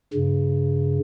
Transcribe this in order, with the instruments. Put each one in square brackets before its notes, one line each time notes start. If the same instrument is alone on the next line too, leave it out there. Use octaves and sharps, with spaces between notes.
[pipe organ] G2 C#3